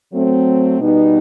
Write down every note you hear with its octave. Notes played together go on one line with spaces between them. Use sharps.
F#3 A3 C4
B2 G3 B3 D#4